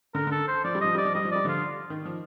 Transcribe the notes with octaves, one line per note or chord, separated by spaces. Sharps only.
D3 A#4
D3
A4
C5
F3 D5
G3
F3 D#5
G3 D5
F3
G3 D#5
F3
G3 D5
D3 F3 F4
D#3
F3